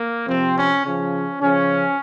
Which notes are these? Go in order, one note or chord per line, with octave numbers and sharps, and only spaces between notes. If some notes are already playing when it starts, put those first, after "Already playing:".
Already playing: A#3
C3 F3 C4
C#4
C#3 F3 C#4
C#3 F3 C#4